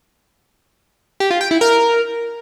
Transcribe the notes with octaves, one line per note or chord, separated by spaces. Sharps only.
G4
F4
G5
E4
A#4